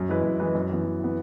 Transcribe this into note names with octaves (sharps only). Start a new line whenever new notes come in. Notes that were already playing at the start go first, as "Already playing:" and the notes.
Already playing: F#2
E3 G#3 E4 B4
F#2
E3 G#3 E4 B4
F#2
E3 B3
F#2
E3 B3